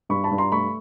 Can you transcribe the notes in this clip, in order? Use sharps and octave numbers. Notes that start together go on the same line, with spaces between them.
G2 B5 C#6
A5 B5
G2
A#5 C6
A3 B5 C#6